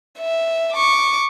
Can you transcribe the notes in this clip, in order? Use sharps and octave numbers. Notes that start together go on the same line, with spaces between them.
E5
C#6 D6